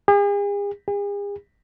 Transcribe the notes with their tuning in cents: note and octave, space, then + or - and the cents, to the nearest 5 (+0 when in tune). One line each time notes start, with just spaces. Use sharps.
G#4 -45
G#4 -45